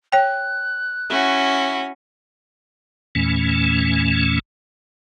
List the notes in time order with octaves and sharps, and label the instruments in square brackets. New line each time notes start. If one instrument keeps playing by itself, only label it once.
[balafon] C#5 G5 [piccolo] F#6
[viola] C#4 [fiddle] E4 F#4
[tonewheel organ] E2 A#2 E3 A3 C#4